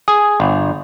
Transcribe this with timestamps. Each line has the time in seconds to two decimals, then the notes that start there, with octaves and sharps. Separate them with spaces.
0.08 G#4
0.40 G1